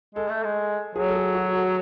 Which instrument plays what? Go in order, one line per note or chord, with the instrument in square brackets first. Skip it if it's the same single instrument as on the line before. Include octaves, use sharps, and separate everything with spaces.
[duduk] G#3 [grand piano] A4
[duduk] A3
G#3
[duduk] F#3 [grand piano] G#4
[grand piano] A4
G#4
F#4
A4